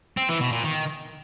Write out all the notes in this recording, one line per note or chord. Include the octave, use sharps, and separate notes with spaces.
C4
E3
B2
A#2
D#3